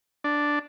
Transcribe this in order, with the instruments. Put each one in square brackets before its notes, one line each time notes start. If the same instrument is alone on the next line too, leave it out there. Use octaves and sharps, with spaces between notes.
[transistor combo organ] D4